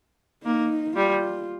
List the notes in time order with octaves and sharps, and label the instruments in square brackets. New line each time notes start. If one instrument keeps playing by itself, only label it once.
[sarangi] A#3 [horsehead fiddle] D#4
[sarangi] G3 [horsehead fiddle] F4